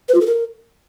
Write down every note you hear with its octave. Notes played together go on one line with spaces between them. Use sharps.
B4
F4
A4
A#4